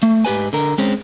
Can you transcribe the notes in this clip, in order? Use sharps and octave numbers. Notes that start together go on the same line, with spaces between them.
A3
G#2 G4 B4 G#5
D3 A#4
G#3 C4 C#4